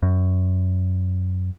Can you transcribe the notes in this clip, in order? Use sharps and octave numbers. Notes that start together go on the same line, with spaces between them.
F#2